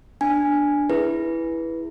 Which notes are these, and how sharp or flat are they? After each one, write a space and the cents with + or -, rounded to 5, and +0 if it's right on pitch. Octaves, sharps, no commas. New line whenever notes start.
D4 +0 G#5 -5
E4 +0 G#4 +0 B4 -10